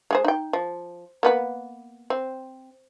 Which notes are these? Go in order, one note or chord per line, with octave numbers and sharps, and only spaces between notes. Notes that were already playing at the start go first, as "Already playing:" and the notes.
G#3 G#4 C5
D#4 G5
F3
A#3 B3 B4
C4